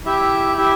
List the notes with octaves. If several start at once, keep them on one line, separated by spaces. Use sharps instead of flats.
E4 G4 E5
E4 G4 E5